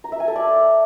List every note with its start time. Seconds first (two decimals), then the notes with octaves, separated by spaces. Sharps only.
0.04 A#5
0.12 E5
0.20 G#5
0.28 A4
0.36 D5